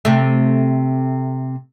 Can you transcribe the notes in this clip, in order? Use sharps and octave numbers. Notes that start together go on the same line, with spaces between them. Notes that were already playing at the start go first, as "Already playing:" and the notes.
C3 A3